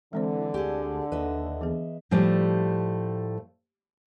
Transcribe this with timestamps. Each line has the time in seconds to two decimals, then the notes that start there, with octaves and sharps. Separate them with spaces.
0.13 D3 E3 G#3 C4 C5
0.54 D2 G4 G#4
1.12 D#2 B4 D#5 E5
1.61 E3 B3 G#4
2.11 A2 F3 G3 A3 D5